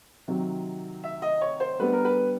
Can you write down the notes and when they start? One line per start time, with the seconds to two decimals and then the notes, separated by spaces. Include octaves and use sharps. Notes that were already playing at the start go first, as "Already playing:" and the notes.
0.28 C3 D#3 F#3
1.04 E5
1.22 D#5
1.41 C#5
1.60 C5
1.79 D3 G3 B3 B4
1.93 A#4
2.05 B4